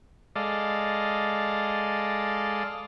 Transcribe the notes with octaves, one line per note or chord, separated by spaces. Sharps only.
G#3 A4 D5 D#5 F5